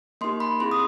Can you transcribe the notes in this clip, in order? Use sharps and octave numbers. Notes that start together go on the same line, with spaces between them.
A#3 D#4 G4 C6
B5
C4 E4 G#4 C6
D#6